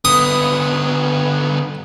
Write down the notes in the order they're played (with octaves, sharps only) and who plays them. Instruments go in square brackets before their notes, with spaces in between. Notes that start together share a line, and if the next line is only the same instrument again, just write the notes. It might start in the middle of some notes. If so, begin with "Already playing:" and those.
[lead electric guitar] D3 B3 [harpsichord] D#6